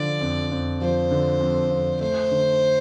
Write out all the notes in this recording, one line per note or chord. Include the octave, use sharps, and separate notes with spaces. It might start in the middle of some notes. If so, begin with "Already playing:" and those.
Already playing: D3 F3 D5
F2
F2
F3 C5
D3
F2
F2
A3 C5
D3